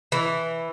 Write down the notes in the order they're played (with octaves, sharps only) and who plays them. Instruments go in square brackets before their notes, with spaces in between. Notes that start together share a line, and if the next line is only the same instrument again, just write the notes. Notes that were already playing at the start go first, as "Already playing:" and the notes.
[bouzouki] E3